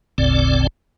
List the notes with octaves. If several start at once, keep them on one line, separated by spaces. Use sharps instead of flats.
G1 D2 A2 C#3 C4 D5